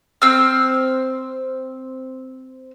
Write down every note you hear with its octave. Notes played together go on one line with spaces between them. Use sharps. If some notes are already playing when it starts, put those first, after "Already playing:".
C4 E6 F6